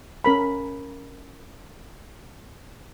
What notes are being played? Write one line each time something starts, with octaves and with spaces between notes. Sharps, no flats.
C#4 A#4 B5